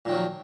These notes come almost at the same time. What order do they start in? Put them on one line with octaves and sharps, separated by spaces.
A#2 D#3 F#3 F3